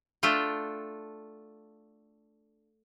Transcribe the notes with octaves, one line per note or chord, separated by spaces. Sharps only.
A3 D4 F4 G5